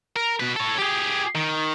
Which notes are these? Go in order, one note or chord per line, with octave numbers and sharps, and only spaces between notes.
A#4
B2 B4
A4 C#5
G4 G#4
D#3